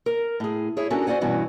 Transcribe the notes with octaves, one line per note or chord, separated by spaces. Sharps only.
A#4
A2 G#4
E4 G#4 C#5
C#4 D4 F#4 G4 A4 A#4
F#4 C5 D5 F#5 G#5
G2 B2 E3 C#4 E4 F#4